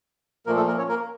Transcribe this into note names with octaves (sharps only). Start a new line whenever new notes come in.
A#2 F3 A3 A#3 A#4
A3 A4
A#3 A#4
C#4 C#5
A#3 A#4